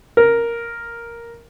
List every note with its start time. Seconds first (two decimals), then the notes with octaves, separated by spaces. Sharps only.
0.17 A#4